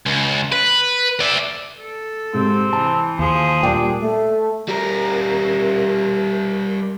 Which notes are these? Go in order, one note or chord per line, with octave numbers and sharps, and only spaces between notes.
C#2
B4
D5 E5
A4
G#2 C3 C4
E3 A5
D#2 F3 G#4
A#2 G3 D4 G5
A3
G3 A#4